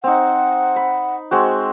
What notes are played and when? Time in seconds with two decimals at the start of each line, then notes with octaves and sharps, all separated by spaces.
0.04 C4 D#4 F#5
0.76 B5
1.31 G#3 C4 F#4